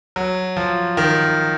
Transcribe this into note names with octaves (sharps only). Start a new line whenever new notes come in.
F#3
F3
D#3